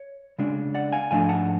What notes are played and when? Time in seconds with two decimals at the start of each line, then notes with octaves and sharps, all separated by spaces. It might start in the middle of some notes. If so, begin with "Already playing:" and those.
Already playing: C#5
0.38 C#3 G#3 D4
0.74 D5 F#5
0.92 F5 G#5
1.11 G#2 F3 A3 D4 F5 G#5
1.29 F#5 A5